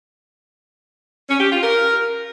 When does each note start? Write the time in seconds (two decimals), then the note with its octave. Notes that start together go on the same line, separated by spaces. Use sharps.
1.29 C#4
1.40 G4
1.51 F4
1.62 A#4